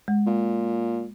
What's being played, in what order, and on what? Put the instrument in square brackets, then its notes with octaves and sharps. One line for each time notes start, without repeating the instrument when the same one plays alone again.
[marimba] G#3
[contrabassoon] A#2